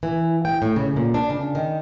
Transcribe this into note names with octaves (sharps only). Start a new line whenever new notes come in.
E3
G5
A2
C#3
A#2
D4
C#3
D#3